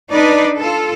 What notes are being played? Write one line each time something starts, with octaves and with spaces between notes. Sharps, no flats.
D4 D#4 B4 D5
F4 A4